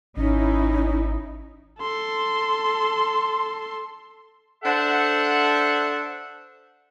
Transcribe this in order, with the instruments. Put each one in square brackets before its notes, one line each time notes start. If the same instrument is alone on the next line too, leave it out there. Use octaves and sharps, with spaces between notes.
[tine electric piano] G#1 [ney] C#4 [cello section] D#4 E4
[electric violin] A4 C6
[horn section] D4 A4 C5 E5 F#5